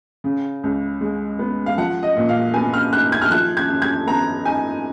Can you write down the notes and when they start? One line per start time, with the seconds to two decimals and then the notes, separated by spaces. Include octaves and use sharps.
0.24 C#3
0.64 C#2
1.01 G#3
1.39 B3
1.66 F5
1.77 F3 F#5
2.03 D#5
2.17 A#2
2.29 F5
2.54 B3 G#5
2.74 F6
2.92 D#4 F#6
3.12 G#6
3.22 F6
3.30 F3 F#6
3.57 G#6
3.70 F#2
3.82 G#6
4.07 B3 A#5
4.45 D#4 G#5